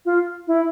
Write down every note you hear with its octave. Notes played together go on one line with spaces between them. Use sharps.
F4
E4